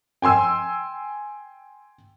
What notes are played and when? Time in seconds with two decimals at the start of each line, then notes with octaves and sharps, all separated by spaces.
0.22 G5 G#5 C6 E6